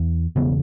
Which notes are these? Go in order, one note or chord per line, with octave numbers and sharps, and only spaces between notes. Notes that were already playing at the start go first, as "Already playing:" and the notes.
Already playing: E2
E1 E2 C#3 B3